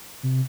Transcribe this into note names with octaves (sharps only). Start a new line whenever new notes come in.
C3